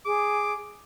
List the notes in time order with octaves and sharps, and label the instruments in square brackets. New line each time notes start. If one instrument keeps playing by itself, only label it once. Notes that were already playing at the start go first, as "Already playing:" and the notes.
[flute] G#4 [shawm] D6